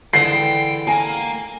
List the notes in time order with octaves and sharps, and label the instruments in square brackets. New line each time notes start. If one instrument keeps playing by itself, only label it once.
[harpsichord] D3 E3 G#3 [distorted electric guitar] G5 [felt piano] C7
[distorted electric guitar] A#3 [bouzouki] G#5